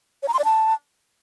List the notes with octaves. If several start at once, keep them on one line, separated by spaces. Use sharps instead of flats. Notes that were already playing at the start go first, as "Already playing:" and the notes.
C#5
A#5
C6
D5
A5